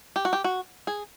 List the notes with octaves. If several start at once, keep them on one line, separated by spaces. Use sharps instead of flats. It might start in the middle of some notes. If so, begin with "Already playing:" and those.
G4
F#4
G4
F#4
G#4